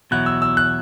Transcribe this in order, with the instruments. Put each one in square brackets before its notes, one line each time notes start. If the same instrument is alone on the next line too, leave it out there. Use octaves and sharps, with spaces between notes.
[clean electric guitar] E2 B2 F#3 E4 [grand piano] F#6
[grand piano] E6
E6
F#6